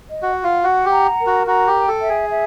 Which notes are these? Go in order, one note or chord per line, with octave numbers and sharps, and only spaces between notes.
D#5
F#4
F#5
F4
F#4 F#5
G4
A#5
A#4
F#4
F#4 A#5
G4
G5
A4
E5
G#4
E5